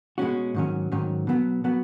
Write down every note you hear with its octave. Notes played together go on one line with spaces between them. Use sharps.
B2 G#3 C#4 F#4
G#2 D#3 F#3 C#4
G#2 D#3 F#3 C#4
B2 F#3 B3
B2 F#3 B3